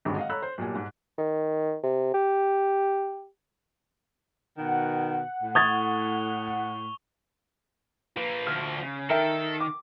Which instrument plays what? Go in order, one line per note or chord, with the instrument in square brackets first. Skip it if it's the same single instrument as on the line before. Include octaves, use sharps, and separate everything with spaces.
[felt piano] D#1 G#1 G2 D3 G#3 F#4
D#5 F5 F#5
A4 C#5 A#5 B5 E6 F#6
C5
B1 A#2 G4 G#5
G#2
[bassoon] D#3
C3
G4
[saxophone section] B2 D#3 [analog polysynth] F#5
[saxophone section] A2
[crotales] C#6 F7 G7 [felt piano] D#6 G#6 A6
[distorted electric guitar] F3 A#3 [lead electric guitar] B4
[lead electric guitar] D2 [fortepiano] F6
[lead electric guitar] C#3
[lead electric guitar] D#3 [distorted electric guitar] A4 [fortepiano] A#4 E5 G5
[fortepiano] D6